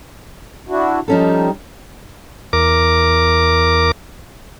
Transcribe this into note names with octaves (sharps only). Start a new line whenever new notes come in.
D4 E4 F#4
F3 G3 C#4 D#4 A4
E2 A#4 D6